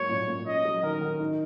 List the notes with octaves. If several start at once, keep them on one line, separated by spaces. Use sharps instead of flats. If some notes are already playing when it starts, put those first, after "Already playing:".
Already playing: G#2 F#3 A#3 C#5
A#2
A#2
C#4 D#5
F#3
D#3 A#4
D#3
D#4